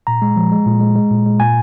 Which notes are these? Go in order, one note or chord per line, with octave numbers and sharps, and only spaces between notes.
A#2 A#5
G#3
F3
G#3
A#2
G#3
G#3
A#2
G#3
A#2 G#5